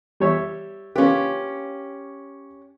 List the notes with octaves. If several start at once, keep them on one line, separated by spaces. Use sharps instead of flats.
G3 C#5 E5
A#3 C#4 F4 G4 B4